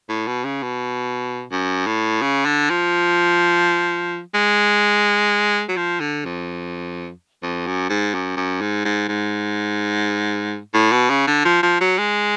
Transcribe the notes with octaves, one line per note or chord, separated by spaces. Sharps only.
A2
B2
C#3
B2
F#2
A2
C#3
D3
F3
G#3
F#3
F3
D3
F2
F2
F#2
G#2
F#2
F#2
G#2
G#2
G#2
A2
B2
C#3
D3
F3
F3
F#3
G#3